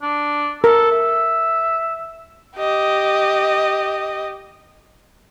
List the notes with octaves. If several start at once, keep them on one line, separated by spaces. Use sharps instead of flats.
D4
A4 A#4
E5
G4 D#5